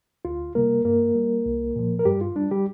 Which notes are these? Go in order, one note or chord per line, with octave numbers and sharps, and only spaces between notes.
D2 F4
C3 G3 A#3 A#4
G2 A#3 A#4
G3
C2
A#2 F3
A#4
G2 G3 G4
F4
G3 D4
G3 G4